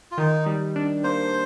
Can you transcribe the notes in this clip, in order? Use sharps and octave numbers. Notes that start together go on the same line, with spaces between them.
F4
D#3 D#4
G3
D4
A#3 C5